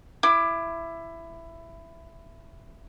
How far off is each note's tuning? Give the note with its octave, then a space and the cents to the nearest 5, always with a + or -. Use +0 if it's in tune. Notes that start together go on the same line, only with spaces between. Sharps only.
E4 +15 D6 +20